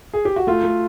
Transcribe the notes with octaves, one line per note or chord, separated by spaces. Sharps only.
G#4
G4
F#4
A3 F4
A3